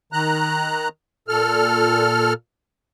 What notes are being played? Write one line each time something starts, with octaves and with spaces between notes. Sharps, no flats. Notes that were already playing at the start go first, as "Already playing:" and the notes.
D#3 A#5 F#6
A#2 A4 F6